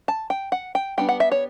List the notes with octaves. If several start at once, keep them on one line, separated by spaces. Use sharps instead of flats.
A5
G5
F#5
G5
G3 B3 D4 G5
F#5
E5
C#5